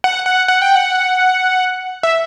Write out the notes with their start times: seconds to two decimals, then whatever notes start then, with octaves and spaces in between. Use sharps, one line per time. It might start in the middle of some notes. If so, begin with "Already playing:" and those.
0.04 F#5
0.26 F#5
0.48 F#5
0.62 G5
0.75 F#5
2.03 E5